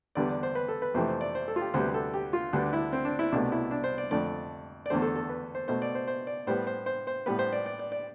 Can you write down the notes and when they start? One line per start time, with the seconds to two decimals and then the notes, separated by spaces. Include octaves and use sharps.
0.15 E2 D3 G3 B3 D5
0.29 D5
0.43 C5
0.55 B4
0.68 A4
0.82 B4
0.94 F2 C3 E3 A3 C5
1.09 C5
1.21 D5
1.35 C5
1.48 A4
1.56 F4
1.61 G4
1.74 D2 C3 G3 B3 C5
1.94 A4
2.14 G4
2.33 F4
2.53 D2 D3 G3 B3 D4
2.73 E4
2.93 C4
3.05 D4
3.19 E4
3.32 C2 B2 A3 D4
3.52 E4
3.71 D4
3.84 C5
3.98 D5
4.11 F2 D3 A3 D5
4.86 D5
4.90 E2 D3 A3 C5
5.02 A4
5.16 A4
5.29 B4
5.55 C5
5.68 B2 A3 C5
5.82 D5
5.95 C5
6.07 C5
6.27 D5
6.47 A2 G3 B3 C5
6.67 C5
6.86 C5
7.07 C5
7.26 A2 G3 B3 B4
7.39 C5
7.53 D5
7.66 D5
7.79 D5
7.92 D5